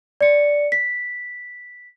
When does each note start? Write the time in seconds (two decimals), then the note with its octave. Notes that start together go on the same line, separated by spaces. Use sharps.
0.21 D5 C#7
0.72 B6